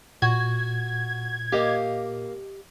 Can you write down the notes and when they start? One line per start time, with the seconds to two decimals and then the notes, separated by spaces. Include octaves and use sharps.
0.22 A#2 F#4 G#6
1.52 A#3 G4 D#5 F5